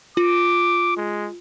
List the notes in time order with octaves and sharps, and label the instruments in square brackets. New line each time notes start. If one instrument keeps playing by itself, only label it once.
[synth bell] F4 [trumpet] D6
[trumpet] G#3